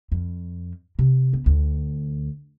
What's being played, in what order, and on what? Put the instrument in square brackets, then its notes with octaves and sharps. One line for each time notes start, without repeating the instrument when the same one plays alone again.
[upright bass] F2
C3
B3
D2